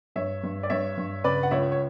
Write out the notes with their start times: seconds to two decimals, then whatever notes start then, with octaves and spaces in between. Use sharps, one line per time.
0.16 G2 C#5 E5
0.43 G2
0.63 D5
0.70 G2 C#5 E5
0.97 G2
1.24 C#3 B4 D5
1.43 F#5
1.51 C#2 C#5 E5
1.72 C#5